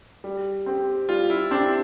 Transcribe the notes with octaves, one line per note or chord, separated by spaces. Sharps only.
G3
C4 G4
G3 F4
E4
C4 D4 G4